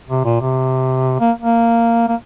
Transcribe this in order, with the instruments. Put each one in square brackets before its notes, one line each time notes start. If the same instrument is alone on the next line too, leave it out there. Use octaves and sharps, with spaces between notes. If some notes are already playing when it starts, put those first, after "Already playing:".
[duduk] C3
A#2
C3
A#3
A#3
A#3